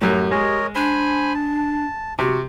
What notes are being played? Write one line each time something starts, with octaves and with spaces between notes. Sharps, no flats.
F#2 A2 G4 A#5
G#3 A#4 C#5 D#5
D4 C5 G#5 B5
A5
C3 F#4